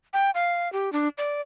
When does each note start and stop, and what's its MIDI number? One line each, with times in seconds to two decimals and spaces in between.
0.13 0.31 79
0.35 0.71 77
0.73 0.92 67
0.93 1.08 62
1.18 1.41 74